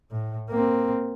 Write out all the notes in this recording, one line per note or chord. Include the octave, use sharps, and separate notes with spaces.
A2
A#3 C4